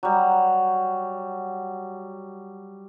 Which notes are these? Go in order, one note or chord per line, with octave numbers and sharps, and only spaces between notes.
F#3 G3